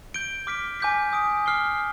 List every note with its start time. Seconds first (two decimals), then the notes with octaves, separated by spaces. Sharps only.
0.14 G6 D7 G7
0.47 D6 F6 B6 D7
0.80 G#5 D6 G6 B6
1.13 D#6 G6 D7
1.46 D6 F6 C7 G7